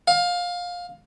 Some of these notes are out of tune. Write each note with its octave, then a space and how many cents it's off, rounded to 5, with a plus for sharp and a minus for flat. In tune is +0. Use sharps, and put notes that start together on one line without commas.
F5 +20